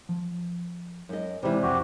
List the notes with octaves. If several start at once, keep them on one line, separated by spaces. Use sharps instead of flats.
F3
F#2 D#5
B1 C3 E3 G3 G#3
B1 F2 F#4 G4